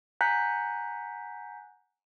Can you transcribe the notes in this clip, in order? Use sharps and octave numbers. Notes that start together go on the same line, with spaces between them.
F#5 G#5 A#5 F#6 G6 B6